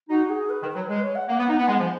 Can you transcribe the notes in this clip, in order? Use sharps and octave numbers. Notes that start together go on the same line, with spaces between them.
D#4 F#4
G#4
B4
D#3
B4
F#3
G#3 B4
C#5
F#5
A#3 F#5
B3
D#4
B3 F#5
G#3 G#5
F3 G#5